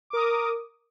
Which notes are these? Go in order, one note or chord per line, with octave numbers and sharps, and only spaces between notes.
A#4 D6 D#6